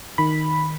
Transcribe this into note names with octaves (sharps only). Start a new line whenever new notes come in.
D#3 B5